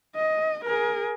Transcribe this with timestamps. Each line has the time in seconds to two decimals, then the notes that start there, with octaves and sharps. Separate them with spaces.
0.16 D#5
0.65 G#4 A#4